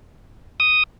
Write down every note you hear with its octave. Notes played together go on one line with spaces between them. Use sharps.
D#6